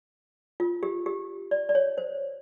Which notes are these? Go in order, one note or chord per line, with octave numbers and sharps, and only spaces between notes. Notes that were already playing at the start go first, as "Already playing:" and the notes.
F4
G4
G4
D5
D5
C#5
C5